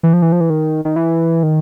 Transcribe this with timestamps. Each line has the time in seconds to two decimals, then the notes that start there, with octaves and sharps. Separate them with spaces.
0.03 E3
0.13 F3
0.22 E3
0.32 F3
0.41 E3
0.50 D#3
0.85 D#3
0.96 E3
1.43 D#3